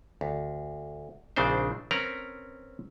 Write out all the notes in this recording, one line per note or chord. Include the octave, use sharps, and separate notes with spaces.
D2
A#1 C#3 C4 D4 D#4 C5
C4 C#4 A#4 B4 A#5